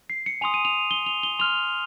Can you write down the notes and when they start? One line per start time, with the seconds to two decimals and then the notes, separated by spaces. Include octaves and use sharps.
0.10 C7
0.26 C#7
0.41 G#5 C6 D#6 F7
0.54 D#7
0.65 F7
0.91 G7
1.06 F7
1.23 G7
1.39 C6 F6 F7